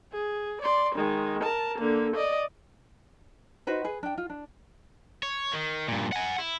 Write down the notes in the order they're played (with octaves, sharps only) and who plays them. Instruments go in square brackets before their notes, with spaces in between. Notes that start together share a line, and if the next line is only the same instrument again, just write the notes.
[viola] G#4
D5 C6
D#3 G#3
A#4 A5
D3 A#3
D5 D#5
[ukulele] D#4 F#4 B4 C5
G#4 B4
D4 G5
F4
D4
[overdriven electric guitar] C#5
D#3
G2 A#2
F#5 G#5
E4